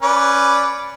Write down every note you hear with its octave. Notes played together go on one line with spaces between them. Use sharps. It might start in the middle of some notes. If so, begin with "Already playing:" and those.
C#4 B4 D5